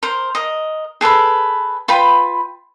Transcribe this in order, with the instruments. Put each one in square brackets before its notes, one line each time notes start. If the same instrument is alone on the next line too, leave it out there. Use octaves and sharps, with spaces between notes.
[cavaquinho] A#4 C5
A#4 D#5
G#4 A4 B4 B5
F4 B4 G5 B5